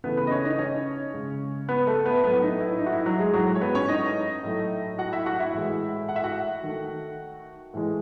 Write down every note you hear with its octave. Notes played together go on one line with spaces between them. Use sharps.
C#3 E3 A3 B3 B4
B3 B4
D#5
C#4 C#5
D#4 D#5
C#4 C#5
C#3 G#3
B3 B4
A3 A4
B3 B4
A2 F#3 A3 B3 B4
D#4
E4
D#4
F#4
E4
F#3 F#4
G#3 G#4
A2 F#3 G#3 F#4
C#5
B3 B4
C#4 C#5
D#4 D#5
A2 F#3 A3
F#4 F#5
E4 E5
F#4 F#5
E4 E5
A2 E3 G#3
F#5
E5
F#4 F#5
D#3 A3
A2 E3 G#3